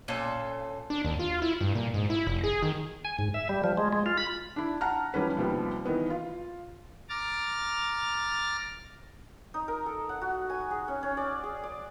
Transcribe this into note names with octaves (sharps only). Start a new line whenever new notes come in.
A#2 C#4 A4 C5
D4
D#2
F4
E4
G2
A#2
G#2
E4
F1
G#4
D#3
G#5
G#2
E5
G3
F3
G#3
G#3
F4
B5
D4 E4
F#5 A5 A#5 F6
E3 F3 G3 C#4 B4
D#2 C3 F3 G3 B3
D#3 E3 B3
F4
A#5 D6 F6 A6
D#4
A#4
A4
F#5
F#4
G#5
G#4
C#4
C#4
D5
G#4
D5